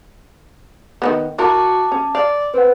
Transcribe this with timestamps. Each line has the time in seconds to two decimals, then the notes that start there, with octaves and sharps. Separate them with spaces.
1.02 D#3 A#3 B3
1.39 E4 F#4 A#4 A5 D6
1.92 C#4
2.15 D5 F5
2.54 C4 B4 F#5